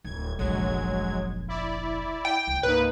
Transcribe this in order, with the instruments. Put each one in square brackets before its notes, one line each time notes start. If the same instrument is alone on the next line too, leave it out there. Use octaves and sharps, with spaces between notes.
[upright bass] D1 [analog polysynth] G#6
[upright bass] F1 A#1 [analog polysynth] F#3 G#3 G#6
[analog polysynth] E4 D5
[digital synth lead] G5
[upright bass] C#2
[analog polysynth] G#2 A#3 D#4 [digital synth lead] B4